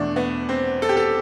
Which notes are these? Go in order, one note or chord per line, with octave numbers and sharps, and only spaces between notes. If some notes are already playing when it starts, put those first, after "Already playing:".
Already playing: E2 B2 A3 D4
B3
C4
A4
G4
A4